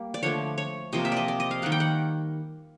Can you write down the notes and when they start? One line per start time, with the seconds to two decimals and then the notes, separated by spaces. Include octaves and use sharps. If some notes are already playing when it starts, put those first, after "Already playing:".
Already playing: G3 A#3
0.14 D5
0.23 D3 F3 A3 C#5
0.58 C#5
0.93 C3 F3 A#3 D#5
1.05 E5
1.12 D5 D#5
1.28 D5
1.40 D#5
1.51 F5
1.62 D#3 G3 A#3 F#5
1.72 G5
1.80 F#5